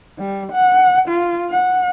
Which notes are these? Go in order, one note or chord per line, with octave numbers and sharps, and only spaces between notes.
G3
F#5
F4
F#5